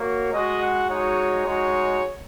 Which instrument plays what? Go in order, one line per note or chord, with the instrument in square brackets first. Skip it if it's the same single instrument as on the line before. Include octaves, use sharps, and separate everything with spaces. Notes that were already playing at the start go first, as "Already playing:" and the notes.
Already playing: [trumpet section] A#3 F#4 C#5
G#3 F#4 D#5
F#5
G#3 D#4 F#4 C#5
G#3 D#4 F#4 C#5